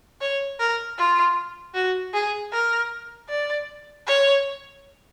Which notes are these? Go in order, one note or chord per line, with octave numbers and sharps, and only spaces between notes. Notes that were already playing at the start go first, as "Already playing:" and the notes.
C#5
A#4
F4
F#4
G#4
A#4
D5
C#5